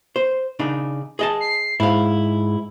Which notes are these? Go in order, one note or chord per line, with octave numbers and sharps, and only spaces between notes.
C5
C#3 D4 D#4
G#4 D#5 A5
C7
G#2 E4 F5